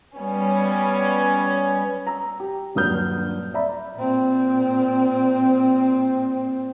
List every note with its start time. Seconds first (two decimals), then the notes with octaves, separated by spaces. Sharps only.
0.16 G3 B3 C#4
2.07 A#5 E6
2.40 G4
2.75 D#1 G2 F#3 D#6 F6 G6
3.54 D5 E5 A#5 B5
3.95 A#2 C4